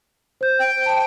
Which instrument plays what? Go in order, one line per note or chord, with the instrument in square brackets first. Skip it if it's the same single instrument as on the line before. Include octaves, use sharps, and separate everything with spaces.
[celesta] C5 G6
[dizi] G5
[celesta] A5